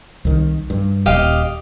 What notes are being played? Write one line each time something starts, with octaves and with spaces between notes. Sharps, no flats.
C2 D#3
G2
D#1 G4 D#5 F5